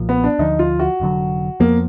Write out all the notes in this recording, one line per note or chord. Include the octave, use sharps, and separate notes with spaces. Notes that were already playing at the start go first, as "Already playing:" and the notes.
Already playing: B1 A#2 F3
B3
D4
D2 D3 F3 D#4
F4
F#4
F1 D#2 D3 F#3
F2 F3 A#3 B3